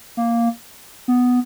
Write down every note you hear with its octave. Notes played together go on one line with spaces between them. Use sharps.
A#3
B3